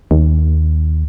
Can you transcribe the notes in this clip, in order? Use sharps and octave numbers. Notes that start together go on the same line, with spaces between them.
D#2